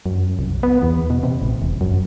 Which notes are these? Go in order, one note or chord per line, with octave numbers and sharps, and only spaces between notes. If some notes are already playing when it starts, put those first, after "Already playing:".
F#2
C2
B3
E2
B2
C3
A1
E1
F#2